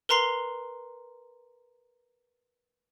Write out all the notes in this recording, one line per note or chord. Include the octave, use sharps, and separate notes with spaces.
A#4 B4 A#5 C6 C7 G7